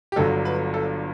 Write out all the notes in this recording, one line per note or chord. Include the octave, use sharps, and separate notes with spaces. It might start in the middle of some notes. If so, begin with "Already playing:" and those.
G4
G1 G2 D3 F#3 A4
B4
A4